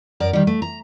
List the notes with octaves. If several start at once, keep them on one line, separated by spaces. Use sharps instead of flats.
F#2 A#4 D5
D#3 G3
A3
A#5